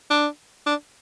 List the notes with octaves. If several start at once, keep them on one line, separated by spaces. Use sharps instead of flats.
D4
D4